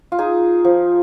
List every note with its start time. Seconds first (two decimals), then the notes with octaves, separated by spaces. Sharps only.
0.12 F4
0.19 D#4 G#4
0.65 F3